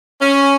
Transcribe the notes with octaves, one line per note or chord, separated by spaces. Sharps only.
C#4